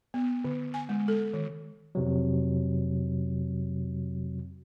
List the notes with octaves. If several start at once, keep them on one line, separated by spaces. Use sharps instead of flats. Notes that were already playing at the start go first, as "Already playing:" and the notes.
B3
D3
G#5
G#3
A4
D#3
F2 C3 F#3